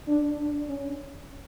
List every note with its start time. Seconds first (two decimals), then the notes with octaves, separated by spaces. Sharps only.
0.08 D4
0.39 D4
0.69 C#4